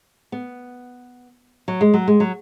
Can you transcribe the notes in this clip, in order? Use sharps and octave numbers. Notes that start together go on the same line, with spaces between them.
B3
F#3
G#3
F#3
G#3
F#3